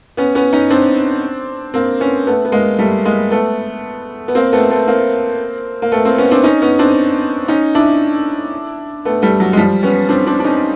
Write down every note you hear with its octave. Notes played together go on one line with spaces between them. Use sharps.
B3 C#4
B3 C#4
C#4 D#4
C4 D4
A#3 C4
B3 C#4
A3 B3
B3
G#3 A#3
G3 A3
G#3 A#3
A3 B3
B3
A#3 C4
A3 B3
A3 B3
A#3 C4
A#3
A3 B3
A#3 C4
B3 C#4
C4 D4
C#4 D#4
B3 C#4
C4 D4
C#4 D#4
D4 E4
A3 B3
G3 A3
F#3
G#3
F3 G3
B3 C#4
C4 D4
C4 D4
D4
C#4 D#4